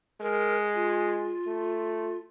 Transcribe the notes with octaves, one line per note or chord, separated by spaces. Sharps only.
G#3 A#4
F4
A3